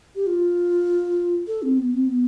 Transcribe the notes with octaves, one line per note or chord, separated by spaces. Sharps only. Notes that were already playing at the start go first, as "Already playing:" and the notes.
G4
F4
A4
C4
B3
C4
B3